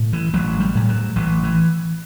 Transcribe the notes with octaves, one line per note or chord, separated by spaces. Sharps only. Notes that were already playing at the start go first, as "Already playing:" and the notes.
Already playing: A2
E3
A1 F#3
G3
A2
F#3
A1 E3
E3